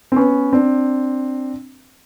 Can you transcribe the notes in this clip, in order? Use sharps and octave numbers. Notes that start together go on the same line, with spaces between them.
C4
B3 C#4
C4 D4